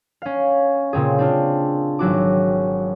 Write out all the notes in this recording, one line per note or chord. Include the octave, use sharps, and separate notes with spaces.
C#4 F5
A#2 C#3 C4 G#4
C4 D4 F4
G#1 F#3 F#4 D6